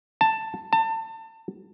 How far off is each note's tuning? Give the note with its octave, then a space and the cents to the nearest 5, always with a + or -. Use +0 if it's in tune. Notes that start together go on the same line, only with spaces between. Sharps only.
A5 +10
A5 +30